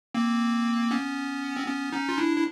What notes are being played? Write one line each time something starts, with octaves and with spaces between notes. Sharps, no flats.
A#3 C4
B3 C#4
C4
B3 C#4
C#4 D#4
F4
D4 E4
E4